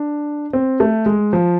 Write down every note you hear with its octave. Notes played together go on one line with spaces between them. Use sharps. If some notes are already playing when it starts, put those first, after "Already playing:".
Already playing: D4
C4
A3
G#3
F3